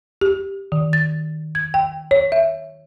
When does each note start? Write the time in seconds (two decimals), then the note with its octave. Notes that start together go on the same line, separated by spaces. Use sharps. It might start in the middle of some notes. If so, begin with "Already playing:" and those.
0.21 G4
0.72 D#3
0.93 A6
1.55 G#6
1.74 G5
2.11 C#5
2.32 E5